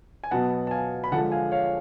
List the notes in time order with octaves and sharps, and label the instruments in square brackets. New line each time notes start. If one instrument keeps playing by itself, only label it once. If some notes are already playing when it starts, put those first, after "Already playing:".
[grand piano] G#5
B2 F#3 B3 F#5 A5
A5
F5 G#5
B5
D3 F3 G#3 F#5 A5
F5 G#5
C#5 F5